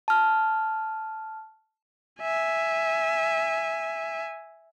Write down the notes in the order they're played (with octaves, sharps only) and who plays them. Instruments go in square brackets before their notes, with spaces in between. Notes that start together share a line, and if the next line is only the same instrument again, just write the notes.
[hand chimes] A5 F6
[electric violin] E5 G#5